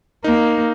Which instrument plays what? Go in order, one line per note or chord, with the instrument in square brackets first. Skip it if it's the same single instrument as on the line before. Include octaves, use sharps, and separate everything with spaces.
[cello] A#3 [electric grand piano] D#4